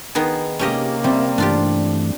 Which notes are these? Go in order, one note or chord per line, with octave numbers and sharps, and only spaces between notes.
D#3 B3 G#4
C3 A#3 C#4 G4 D#5
G3 C4 D5 E5
G2 E3 A3 D4 F4 G4